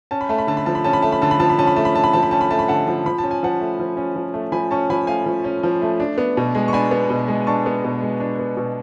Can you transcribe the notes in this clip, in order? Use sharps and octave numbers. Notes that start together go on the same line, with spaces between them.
C#4 A5
B5
A3 A5
B5
D3 A5
B5
F3 A5
B5
C#4 A5
B5
A3 A5
B5
D3 A5
B5
F3 A5
B5
C#4 A5
B5
A3 A5
B5
D3 A5
B5
F3 A5
B5
C#4 A5
B5
A3 A5
B5
D3 F#5 A5
F3
F3 B5
A5
C#4
G#5
F3 F#5 A5
A3
F3
C#4
F3
A3
F3 G#5 B5
C#4 A5 C#6
F3 G#5 B5
A3 F5 G#5
F3
C#4
F3
A3
D4
B3
B2
G#3
C#6
D4 G#5 B5
B3
B2
G#3
D4 A5 C#6
B3
B2
G#3
D4
B3
B2